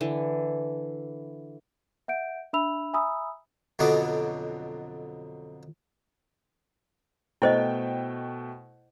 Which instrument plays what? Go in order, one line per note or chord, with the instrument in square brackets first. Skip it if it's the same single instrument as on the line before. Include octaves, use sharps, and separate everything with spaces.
[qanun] D3 E3
[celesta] E5 F#5 G6 D7
D4 E5 B5 E6 F7
E5 G#5 A#5 B5 D#6 E6
[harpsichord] F2 B2 D3 F#3 D#5 D6
[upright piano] B2 A3 G5 [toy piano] E4 C5 D#5